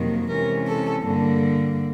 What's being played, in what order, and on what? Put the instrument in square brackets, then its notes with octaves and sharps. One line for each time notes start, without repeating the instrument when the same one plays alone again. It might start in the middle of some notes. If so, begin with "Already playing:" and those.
Already playing: [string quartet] F2 C3 D#3 F#3 A#3
C3 E3 G#3 C#4 A#4
A4
G2 D3 G3 A#3